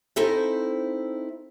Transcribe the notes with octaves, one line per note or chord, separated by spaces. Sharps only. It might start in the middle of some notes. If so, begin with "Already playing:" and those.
C4 D#4 E4 A4 C5 E5